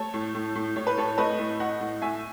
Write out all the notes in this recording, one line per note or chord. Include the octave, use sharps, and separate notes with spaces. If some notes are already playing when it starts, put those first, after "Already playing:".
Already playing: A3 A4 C#5
A2
A2
A2
A2 C#5
B4
A2 A4 C#5
A3 B4 D#5
A2
A2 D#5 F#5
A2
A2 E5 G#5